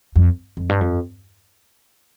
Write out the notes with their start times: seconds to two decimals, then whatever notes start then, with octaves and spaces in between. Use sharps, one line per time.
0.16 F2
0.57 F2
0.69 G2
0.81 F2